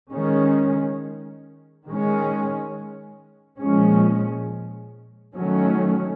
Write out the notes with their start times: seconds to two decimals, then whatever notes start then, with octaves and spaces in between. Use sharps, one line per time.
0.11 D#3 G#3 C#4
1.86 D#3 G#3 C#4
3.61 A#2 F3 G#3 C#4
5.36 D#3 F#3 A3 C#4